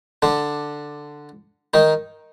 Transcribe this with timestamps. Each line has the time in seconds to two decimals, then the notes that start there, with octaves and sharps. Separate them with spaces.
0.22 D3 D4
1.74 D#3 D#4